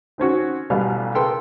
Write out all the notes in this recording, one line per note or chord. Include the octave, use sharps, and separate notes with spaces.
D#3 C4 C#4 F#4
A1 B2 G3 F5
C#3 B3 A4 A#4 G5 C6